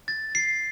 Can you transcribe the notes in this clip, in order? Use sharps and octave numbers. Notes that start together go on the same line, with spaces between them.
A6
C7